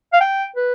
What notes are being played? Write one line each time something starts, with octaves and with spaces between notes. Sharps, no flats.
F5
G5
B4